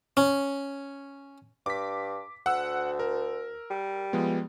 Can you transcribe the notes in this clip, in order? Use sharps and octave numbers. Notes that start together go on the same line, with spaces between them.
C#4
G2 D6 B6
D2 F#5 E6
A#4
G3
F3 G#3 B3